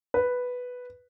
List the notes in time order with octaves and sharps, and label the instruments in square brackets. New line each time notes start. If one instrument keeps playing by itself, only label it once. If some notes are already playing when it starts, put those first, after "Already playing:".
[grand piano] B4